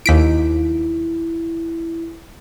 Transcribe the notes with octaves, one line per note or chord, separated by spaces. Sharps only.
D#2 E4 B6 D7